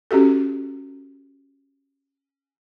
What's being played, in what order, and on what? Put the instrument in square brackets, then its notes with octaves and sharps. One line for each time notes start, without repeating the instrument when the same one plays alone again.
[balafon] C#4 F#4 G4 A4